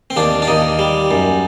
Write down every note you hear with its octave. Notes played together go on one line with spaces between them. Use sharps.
C4
D#2 D4
D4
D#2 D#4
G3
F#2